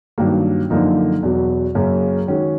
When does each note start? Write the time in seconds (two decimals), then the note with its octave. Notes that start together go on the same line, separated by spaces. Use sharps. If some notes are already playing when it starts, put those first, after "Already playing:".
0.18 G2 D#3 F#3 A#3
0.70 F#2 D3 F3 A#3 D#4
1.23 E2 B2 F#3
1.75 F#2 C#3 F#3 A#3 C#4
2.28 D#3 G#3 C#4 F#4